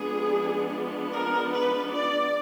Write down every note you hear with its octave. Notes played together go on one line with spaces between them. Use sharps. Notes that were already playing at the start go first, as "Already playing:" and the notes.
Already playing: F3 G#3 B3 D4 G#4
A#4
B4
D5